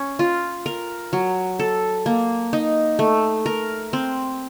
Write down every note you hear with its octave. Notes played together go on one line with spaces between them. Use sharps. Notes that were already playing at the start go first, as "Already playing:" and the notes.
Already playing: C#4
F4
A#4
F#3
A4
A#3
D#4
A3
A#4
C4